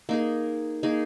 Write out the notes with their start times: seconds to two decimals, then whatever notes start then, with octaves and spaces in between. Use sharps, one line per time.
0.09 A#3 D#4 G#4
0.83 A#3 D#4 G#4